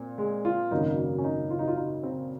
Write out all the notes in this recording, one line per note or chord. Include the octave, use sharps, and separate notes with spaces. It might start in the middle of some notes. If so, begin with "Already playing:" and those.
Already playing: A#2 C4
G#3
F4
G#1 F#2 C#3 F#3 A#3 D#4
C#4
D#4
F4
D#4
F4
D#4
C4